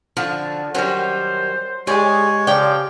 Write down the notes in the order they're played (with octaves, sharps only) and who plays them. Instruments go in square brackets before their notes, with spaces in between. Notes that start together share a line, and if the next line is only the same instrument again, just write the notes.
[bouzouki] D3 F#4 [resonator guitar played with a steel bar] F3
[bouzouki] D#3 C#4 [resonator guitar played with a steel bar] F#3 G3 [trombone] C5
[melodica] G#3 C#5 [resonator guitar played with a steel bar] G4 D5 G#5 [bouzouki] G#4
[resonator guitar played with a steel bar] C#3 [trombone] F3 [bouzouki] G4 D5 G5